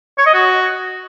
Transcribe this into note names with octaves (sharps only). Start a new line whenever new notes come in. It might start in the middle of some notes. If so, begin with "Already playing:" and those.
C#5
D#5
F#4